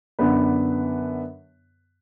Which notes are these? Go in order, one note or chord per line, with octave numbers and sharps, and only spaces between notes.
F#2 D3 B3 D4 B4